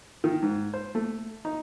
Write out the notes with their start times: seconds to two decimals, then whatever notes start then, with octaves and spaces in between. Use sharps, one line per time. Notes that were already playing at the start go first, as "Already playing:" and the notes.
0.24 D#3
0.43 G#2
0.74 C5
0.95 A3
1.45 D#4